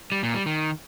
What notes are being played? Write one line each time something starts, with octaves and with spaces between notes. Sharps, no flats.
G3
A#2
G3
D#3